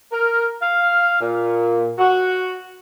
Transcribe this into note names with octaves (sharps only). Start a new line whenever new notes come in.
A#4
F5
A#2
F#4